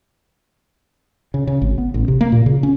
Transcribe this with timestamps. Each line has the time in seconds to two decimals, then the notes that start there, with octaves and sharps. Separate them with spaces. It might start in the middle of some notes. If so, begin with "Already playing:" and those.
1.34 C#3
1.47 C#3
1.62 G#1
1.78 B3
1.94 A1
2.08 C3
2.21 A#3
2.32 A#2
2.46 C#3
2.63 C#4